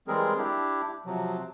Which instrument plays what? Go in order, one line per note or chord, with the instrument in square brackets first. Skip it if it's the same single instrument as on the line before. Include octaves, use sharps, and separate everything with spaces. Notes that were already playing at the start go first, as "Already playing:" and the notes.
[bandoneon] E3 G3 G#3 C4 G#4 A#4
D4 E4 G4
C3 F3 F#3